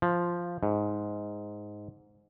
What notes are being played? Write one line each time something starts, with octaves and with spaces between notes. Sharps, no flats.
F3
G#2